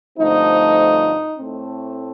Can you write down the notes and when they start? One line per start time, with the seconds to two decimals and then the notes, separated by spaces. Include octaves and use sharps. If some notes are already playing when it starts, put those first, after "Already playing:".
0.18 G2 D3 F3 A3 C4 D#4
1.37 A2 A3 C4